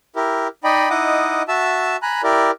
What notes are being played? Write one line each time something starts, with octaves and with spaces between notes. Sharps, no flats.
E4 G4 A#4
D#4 D5 D#5 G5 B5
D#4 E4 D#5 F#5 D6 D#6
F#4 E5 A5 E6
G#5 A#5 B5 F#6
E4 G4 A#4 D5